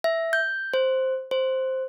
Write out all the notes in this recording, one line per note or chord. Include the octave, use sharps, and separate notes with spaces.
E5
G6
C5
C5